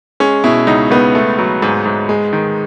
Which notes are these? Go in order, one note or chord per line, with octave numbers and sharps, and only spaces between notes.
G#3 C#4
B2 E4
C#2 D#4
C#2 B3
A3
F#3
G#2
G#2
G#3
D#3